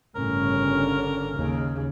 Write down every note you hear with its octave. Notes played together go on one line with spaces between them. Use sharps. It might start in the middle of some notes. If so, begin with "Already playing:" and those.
G1 A2 C#3 C#4 A#4
D3
D#2 C#3